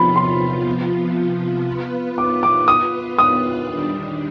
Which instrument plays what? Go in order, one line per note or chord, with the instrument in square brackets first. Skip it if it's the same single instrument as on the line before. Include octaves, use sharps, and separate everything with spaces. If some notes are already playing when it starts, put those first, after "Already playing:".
Already playing: [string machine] C3 F3 B3 F4 [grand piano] B5
[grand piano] C6
[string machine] B3 F4 B4
[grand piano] D6
D6
D#6
D#6
[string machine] D#3 G3 D4